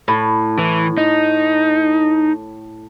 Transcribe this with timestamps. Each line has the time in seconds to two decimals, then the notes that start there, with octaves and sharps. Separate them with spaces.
0.08 A2
0.59 E3
0.98 D#4